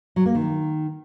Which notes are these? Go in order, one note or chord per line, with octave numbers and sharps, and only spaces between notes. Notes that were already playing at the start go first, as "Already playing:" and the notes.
F#3
A#3
D#3